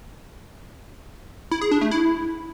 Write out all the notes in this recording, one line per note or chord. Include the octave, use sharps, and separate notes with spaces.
E4
G#4
D4
A3
E4